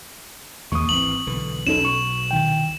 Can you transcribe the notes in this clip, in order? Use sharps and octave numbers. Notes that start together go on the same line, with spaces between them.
D#2 G#3 A#3 C#6 D#6
G#1 E3 C4 F#7
B1 D3 E3
B1 B2 C#4 D#4 A4 E7
C#6
C2 D#3 G5